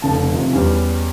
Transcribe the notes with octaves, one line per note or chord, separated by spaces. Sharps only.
F1 C#3 A5
C3 D#3 F3
E2 G3 C#4